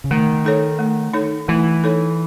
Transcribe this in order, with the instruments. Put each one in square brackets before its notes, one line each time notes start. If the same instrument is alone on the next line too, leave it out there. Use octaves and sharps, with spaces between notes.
[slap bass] C#3
[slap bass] D#3 [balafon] A3
[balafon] D#4 A4 C#5
A3
D#4 A4 C#5
[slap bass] E3 [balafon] A3
[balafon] D#4 A4 C#5